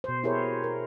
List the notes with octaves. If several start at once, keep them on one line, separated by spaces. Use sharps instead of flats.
B2 C5
E4 G4 G#4 A#4 C5 C#5
A#4